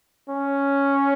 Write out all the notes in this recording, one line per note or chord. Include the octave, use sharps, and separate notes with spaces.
C#4